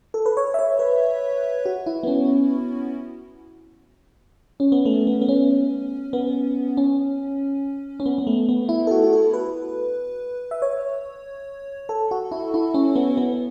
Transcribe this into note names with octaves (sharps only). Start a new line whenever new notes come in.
A4
B4
C#5
E5
C#5
B4
F#4
E4
B3
C#4
C#4
B3
A3
B3
B3
C#4
B3
C#4
C#4
B3
B3
A3
B3
E4
A4
F#4
F#4
A4
B4
E5
C#5
A4
F#4
E4
E4
C#4
B3
B3